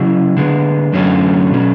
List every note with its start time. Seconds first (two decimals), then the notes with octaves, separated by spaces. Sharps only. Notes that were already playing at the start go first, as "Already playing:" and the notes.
Already playing: C#3 F#3 C#4 E4
0.37 D3 G#3 B3
0.93 F#2 D3 F#3 A3 C#4
1.51 B2 F#3 C#4